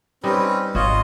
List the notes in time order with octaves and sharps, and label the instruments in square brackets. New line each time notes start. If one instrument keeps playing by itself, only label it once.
[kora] G3 D#4 [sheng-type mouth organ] C4 C#4 B4
[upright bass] G#1 [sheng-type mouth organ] F4 D#5 [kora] F#4 C#5